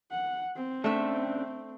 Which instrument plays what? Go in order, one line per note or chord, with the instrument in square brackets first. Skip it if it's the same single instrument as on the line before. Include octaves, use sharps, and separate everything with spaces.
[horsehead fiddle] F#5
C4
[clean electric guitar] C3 C#4 D4 [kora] A3 E5